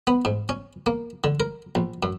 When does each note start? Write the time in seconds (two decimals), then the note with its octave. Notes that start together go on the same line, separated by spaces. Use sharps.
0.07 B3
0.25 G#2
0.49 C#4
0.86 A#3
1.24 D3
1.40 A#4
1.75 A#1
2.03 F#2